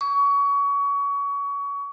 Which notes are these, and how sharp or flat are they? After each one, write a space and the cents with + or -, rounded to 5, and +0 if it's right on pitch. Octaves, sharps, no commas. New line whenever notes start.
C#6 +25